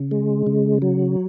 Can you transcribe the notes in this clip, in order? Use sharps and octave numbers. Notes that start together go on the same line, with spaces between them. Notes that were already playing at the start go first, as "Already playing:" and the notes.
Already playing: C#3
G#3
C#3
F#3